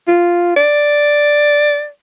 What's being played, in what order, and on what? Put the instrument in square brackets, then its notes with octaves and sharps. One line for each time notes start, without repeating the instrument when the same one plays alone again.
[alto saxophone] F4
D5